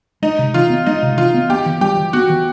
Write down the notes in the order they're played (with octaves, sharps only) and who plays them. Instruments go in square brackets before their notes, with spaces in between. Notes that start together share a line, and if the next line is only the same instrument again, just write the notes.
[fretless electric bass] G#3 [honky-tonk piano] D#4
[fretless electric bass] C3
[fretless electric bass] E3 [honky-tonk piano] F4
[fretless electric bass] B3
[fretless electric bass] G#3 [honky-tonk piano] D#4
[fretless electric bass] C3
[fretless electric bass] E3 [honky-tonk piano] F4
[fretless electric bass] B3
[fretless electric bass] B3 [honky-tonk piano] G4
[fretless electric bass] E3
[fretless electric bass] G3 [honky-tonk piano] G4
[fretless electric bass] E3
[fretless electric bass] B3 [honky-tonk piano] F#4
[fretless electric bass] E3